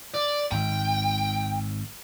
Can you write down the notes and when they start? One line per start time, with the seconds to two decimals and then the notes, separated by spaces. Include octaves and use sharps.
0.14 D5
0.51 G#1 G5